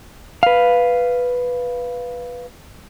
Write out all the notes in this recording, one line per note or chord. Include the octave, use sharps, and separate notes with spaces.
B4 F5